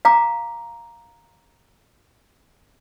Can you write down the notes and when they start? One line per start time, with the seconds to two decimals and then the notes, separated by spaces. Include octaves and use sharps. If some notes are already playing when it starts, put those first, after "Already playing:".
0.05 F5 A#5 D6